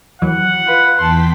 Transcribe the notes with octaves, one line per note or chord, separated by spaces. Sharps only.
D#2 E3 F#3 F#5
F4 B4
E2 G5 A5 C6 B6